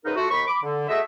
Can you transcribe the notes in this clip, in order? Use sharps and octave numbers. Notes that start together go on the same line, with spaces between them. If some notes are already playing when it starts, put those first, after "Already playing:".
G#2 C#3 D#4 G#4 A#4 B4
A3 F4 F#4
D#2 B5 C#6
B5 D6
D3
A3 F#4 G#4 D#5 E5